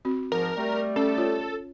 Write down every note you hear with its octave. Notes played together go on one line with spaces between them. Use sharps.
C4 F#4
G#2 F3 A#4
G3 A3
C#4 A4
F4 C#5